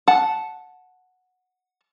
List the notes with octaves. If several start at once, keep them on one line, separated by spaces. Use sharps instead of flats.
F#5 A5